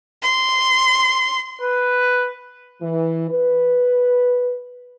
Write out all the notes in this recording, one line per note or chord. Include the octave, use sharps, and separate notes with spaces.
C6
B4
E3
B4